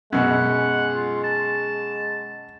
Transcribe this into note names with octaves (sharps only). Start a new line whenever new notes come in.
F#2 B2 G#3 F#5
F4
A5